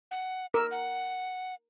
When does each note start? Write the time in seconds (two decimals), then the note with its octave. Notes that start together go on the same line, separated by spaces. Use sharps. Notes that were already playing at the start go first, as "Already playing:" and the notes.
0.11 F#5
0.54 A#4 E6
0.71 F#5